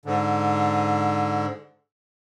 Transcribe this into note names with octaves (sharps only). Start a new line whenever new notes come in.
G#2 D3